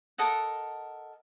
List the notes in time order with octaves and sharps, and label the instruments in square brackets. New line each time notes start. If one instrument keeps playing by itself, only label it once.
[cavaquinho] A4 A#4 D#5 F#5